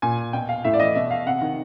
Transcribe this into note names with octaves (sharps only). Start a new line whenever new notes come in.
A#2 G#5
B2 G5
F5
A2 E5
D5
E3 D#5
B2 E5
F5
C3 F#5
D#3